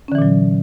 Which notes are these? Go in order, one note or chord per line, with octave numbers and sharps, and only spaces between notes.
A#2 D3 E3 F#3 C#4